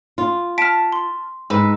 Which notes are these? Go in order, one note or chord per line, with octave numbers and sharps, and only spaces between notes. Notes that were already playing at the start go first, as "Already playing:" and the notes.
F4
A5 F6 B6 D7
C6
G#2 B4 E6